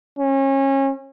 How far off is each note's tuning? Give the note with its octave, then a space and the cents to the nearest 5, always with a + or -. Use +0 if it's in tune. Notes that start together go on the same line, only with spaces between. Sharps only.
C#4 -30